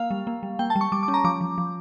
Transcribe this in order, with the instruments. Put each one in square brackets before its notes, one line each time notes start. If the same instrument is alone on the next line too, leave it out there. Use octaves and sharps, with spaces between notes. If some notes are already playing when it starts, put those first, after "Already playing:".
Already playing: [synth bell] A#3 F5
G3
A#3
G3
A#3 G5
A5
G3
C#6
G3 D6
D6
C#4
A#5
F3 D6
F3
F3